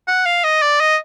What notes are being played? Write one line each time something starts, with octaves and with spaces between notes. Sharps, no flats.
F#5
F5
D#5
D5
D#5